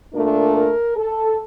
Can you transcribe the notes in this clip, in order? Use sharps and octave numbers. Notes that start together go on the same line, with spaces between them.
A#2 A3 D4 A#4
A#4
A4